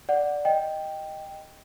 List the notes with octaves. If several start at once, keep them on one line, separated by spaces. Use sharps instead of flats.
D5 F#5
D#5 G5